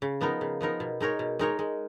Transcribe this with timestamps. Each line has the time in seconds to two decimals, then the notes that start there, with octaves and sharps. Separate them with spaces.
0.02 C#3
0.21 F3 B3 D#4 A#4
0.41 C#3
0.61 F3 B3 D#4 A#4
0.80 B2
1.00 G#3 D#4 A#4 C#5
1.19 B2
1.39 G#3 D#4 A#4 C#5
1.59 G#3